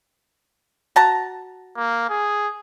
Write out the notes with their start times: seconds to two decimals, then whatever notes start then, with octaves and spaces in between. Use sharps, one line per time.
0.96 F#4 A5 A#5
1.77 A#3
2.10 G#4